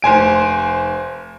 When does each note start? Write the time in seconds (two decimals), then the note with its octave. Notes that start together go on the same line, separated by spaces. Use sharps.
0.02 F1 C5 G#5 D7